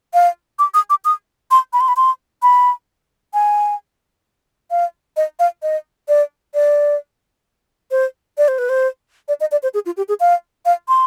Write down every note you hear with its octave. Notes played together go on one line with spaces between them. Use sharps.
F5
D6
D#6
D6
D#6
C6
B5
C6
B5
C6
B5
G#5
F5
D#5
F5
D#5
D5
D5
C5
D5
C5
B4
C5
D5
D#5
D5
C5
G#4
F4
G4
G#4
F5
F5
C6